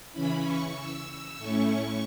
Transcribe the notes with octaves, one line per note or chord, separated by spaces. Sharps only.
C#3 E3 C#4 E4 B5
C#6
E6
A2 A3 C#4 E4 C#6